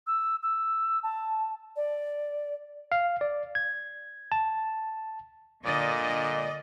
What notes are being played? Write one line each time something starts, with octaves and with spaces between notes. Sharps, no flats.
E6
E6
A5
D5
F5
D5
G#6
A5
A#2 D3 D5 D#5